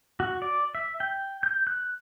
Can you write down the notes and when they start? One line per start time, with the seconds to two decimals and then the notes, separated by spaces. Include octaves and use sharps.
0.20 F#4
0.42 D5
0.75 E5
1.00 G5
1.43 G6
1.67 F#6